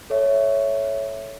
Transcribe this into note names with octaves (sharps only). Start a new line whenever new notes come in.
A4 C#5 E5